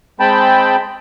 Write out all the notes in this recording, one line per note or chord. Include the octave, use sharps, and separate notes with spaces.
G#3 C4 G5 A5 B5